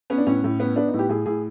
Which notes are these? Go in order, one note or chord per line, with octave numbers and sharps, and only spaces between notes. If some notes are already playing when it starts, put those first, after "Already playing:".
B3 C#4
D4
A2 C#4
A2
B3
B3 D4
D#4
A2
G4
A2 G#4
A2 G#4